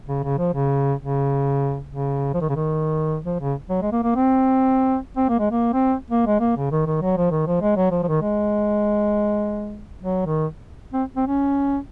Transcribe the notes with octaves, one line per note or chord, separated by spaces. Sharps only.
C#3
C#3
F3
C#3
C#3
C#3
F3
D#3
C#3
D#3
F3
C#3
F#3
G#3
A#3
A#3
C4
C4
A#3
G#3
A#3
C4
A#3
G#3
A#3
C#3
D#3
D#3
F#3
F3
D#3
F3
G#3
F#3
F3
F3
D#3
G#3
F#3
D#3
C4
C4
C#4